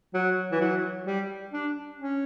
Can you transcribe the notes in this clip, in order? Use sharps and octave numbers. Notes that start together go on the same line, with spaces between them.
F#3
E3
F#3
G3
D4
C#4